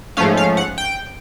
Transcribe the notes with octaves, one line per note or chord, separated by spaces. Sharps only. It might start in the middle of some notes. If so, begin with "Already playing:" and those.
G#2 F3 A3 C#4 F5
F5
F#5
G5